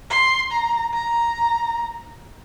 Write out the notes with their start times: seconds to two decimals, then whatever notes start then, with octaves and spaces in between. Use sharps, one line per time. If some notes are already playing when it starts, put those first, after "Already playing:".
0.11 C6
0.51 A#5
0.93 A#5